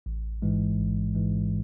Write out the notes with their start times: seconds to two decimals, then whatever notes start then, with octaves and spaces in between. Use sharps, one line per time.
0.06 A1
0.42 G#2 E3 G#3
0.79 A1
1.15 G#2 E3 G#3